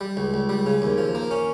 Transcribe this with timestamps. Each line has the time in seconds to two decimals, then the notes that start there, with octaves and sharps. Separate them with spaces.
0.01 G3
0.17 C#2
0.34 C#2
0.49 G3
0.66 C#3
0.82 D#2
0.98 F3
1.15 A#3
1.31 C#4